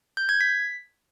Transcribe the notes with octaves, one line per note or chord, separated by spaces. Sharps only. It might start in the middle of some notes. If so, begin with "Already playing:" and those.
G6
G#6
B6